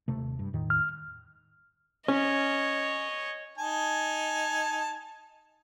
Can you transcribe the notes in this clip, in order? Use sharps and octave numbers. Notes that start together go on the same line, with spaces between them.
D#1 C3 A3
G2
E2 A2 D#3
F6
C#4 C#5 D#5
D#4 G#5 A5